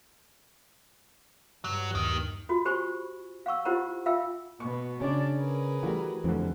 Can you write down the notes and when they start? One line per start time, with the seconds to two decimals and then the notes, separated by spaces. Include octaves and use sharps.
1.64 G2 F#3
1.95 D#2 D#3
2.49 F4 F#4
2.65 G4 C5 G#5 B5 C#6
3.46 F5 F#5 C#6 E6
3.65 E4 F4 G4 C5 F#5 A#5
4.06 F4 E5 F5 G5 E6
4.60 B2 B3 C#6
5.01 C#3 C#4 D4 D5
5.36 G#4 A#4 B4
5.83 E3 G3 A3 F#4
6.24 F1 F2 D3 E3